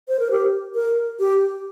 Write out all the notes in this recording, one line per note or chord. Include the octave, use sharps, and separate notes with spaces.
C5
A#4
G4
A#4
G4